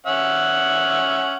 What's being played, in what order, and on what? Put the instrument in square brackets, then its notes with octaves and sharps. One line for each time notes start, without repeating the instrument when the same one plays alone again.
[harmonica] C#4 E5 F#5